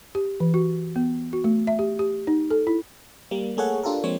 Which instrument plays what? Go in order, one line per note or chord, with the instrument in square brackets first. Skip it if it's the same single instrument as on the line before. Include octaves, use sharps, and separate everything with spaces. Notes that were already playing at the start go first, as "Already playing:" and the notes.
[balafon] G4
E3
F#4
B3
F#4
A3
E5
G4
G4
D#4
A4
E4
[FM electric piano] G3 A#3
A3 A#3 G#4 A4 C#5 F#5
D4 F4 G4 A4 A#4
F3 G#3 A#3 C4 C#5